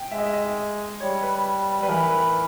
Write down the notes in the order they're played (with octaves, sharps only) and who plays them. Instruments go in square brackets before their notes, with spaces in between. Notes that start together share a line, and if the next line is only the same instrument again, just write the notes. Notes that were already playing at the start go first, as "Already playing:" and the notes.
Already playing: [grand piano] G5
[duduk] G#3 [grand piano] E5
[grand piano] D#5
E5
D#5
[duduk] G3 [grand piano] C#5
[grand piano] B4
[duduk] G3 [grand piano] B4
[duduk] E3 [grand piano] A#4
[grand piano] B4